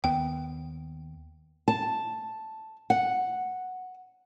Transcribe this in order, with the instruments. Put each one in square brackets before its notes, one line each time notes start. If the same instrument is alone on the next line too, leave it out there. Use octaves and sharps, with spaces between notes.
[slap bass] D#2 B3 [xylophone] G5
[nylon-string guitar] A5
F#5